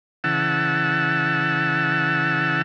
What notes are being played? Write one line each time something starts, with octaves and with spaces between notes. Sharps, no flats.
C#3 E3 F#5 A5 E6